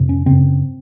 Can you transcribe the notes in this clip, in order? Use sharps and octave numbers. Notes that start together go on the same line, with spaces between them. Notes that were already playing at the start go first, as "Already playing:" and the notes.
Already playing: F2 C3
C#4
F#2 C#3 C4